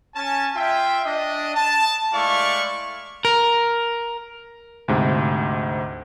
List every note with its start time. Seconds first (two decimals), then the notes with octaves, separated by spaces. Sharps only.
0.15 C#4 G#5 A5
0.56 F4 E5 G5
1.04 D4 D#5
1.55 A5
2.13 G#3 A3 E4 D5 F5 C#6
3.25 A#4
4.88 D2 G#2 C3